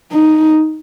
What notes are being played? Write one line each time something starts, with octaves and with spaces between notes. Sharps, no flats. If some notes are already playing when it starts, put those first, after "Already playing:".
D#4